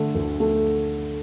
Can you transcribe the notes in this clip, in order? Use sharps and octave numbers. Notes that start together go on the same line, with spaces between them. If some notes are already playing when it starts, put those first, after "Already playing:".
Already playing: D3 A3
D2
A3